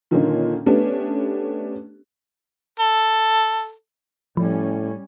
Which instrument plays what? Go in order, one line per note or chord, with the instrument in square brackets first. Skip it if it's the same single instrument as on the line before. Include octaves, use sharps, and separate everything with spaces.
[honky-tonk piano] A#2 D3 D#3 F3 A#3 C#4
A3 B3 C#4 D4 G4
[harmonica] A4
[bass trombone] A2 [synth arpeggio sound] F3 [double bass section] G3 C#4